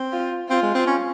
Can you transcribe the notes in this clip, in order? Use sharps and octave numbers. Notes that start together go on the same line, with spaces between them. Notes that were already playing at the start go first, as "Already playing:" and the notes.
Already playing: C4
F4
C4 F4
G#3
C4
C#4